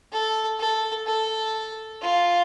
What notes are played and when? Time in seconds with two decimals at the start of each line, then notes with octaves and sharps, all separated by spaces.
0.12 A4
0.59 A4
1.06 A4
2.02 F4